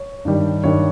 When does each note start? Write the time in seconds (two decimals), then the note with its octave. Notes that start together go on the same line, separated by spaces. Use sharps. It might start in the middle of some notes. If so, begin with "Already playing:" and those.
Already playing: C#5
0.25 G2 D#3 G3
0.64 G2 D#3 G3 C#5